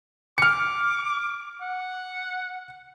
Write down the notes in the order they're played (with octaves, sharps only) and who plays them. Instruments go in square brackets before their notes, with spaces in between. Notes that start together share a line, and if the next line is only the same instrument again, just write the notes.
[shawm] D6 [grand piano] F6 C#7
[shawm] F#5